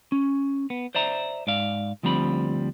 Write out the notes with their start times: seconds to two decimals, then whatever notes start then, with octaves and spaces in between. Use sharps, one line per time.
0.12 C#4
0.70 B3
0.95 C5 D5 E5 A#5
1.47 G#2 D5 F5
2.03 D2 F3 G3 C4 A#5 B5